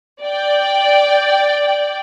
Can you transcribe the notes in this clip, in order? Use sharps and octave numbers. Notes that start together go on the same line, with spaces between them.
D5 G5